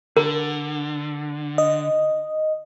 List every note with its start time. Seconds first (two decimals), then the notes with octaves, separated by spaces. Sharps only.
0.17 D3 A#4
1.58 D#5